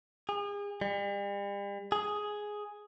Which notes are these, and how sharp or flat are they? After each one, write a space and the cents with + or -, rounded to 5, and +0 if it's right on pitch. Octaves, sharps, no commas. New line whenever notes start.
G#4 -35
G3 +40
G#4 +5